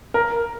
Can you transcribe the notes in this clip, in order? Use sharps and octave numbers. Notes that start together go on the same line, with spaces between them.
A#4